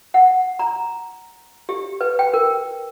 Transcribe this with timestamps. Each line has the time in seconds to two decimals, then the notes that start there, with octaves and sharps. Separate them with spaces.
0.14 F#5
0.59 A#5
1.69 G4
2.01 B4
2.19 G5
2.34 A#4